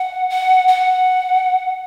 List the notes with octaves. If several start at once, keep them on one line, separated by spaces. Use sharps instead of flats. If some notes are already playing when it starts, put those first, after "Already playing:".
Already playing: F#5
F#5
F#5